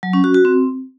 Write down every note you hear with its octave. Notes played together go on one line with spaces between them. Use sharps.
F#3
C#4
F#4
F#4
C4